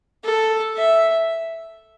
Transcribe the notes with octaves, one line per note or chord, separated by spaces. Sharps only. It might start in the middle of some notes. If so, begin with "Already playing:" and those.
A4
E5